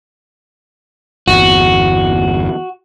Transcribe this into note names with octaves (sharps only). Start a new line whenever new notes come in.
G1 E2 F#4